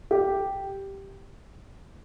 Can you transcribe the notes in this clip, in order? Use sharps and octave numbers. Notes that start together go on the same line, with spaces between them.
G4